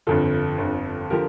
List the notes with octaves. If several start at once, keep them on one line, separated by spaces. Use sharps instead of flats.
G1 F2 D3 F4 A4
G1 F2 D3
D3 F3 G4 A#4